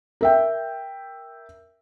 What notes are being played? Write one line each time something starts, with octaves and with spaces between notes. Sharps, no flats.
A#4 E5 G5